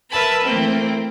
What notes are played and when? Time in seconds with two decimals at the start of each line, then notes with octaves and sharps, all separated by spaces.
0.11 A#4 B4 E5 A5 B5
0.45 E3 A3 A#3 C4